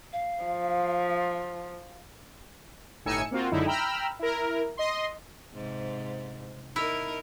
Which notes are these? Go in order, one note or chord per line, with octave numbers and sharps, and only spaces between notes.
F5
F3
G1 A2 D#4 G#5 E6 C#7
A#3 C4 F4 F#4
C#2 F#2 D3 D#4 E4
G5 A#5 B5 E6 F6
E4 A#4
D#5 C6
G#2 C3
D#4 E4 A#4